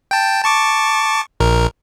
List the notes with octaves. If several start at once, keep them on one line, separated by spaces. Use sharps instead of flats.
G5 A5
A5 C#6 D6
A#1 A#4